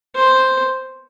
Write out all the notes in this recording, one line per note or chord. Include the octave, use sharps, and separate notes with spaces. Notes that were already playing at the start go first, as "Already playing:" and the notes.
C5